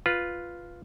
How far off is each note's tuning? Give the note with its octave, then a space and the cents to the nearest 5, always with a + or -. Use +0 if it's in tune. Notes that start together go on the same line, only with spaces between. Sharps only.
F4 +0 B4 +0